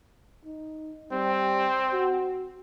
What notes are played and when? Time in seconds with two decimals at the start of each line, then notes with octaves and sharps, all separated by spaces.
0.45 D#4
1.12 G3 C4
1.92 F#4